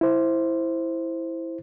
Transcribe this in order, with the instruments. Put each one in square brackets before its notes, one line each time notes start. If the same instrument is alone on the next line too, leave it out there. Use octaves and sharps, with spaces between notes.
[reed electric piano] E4 C5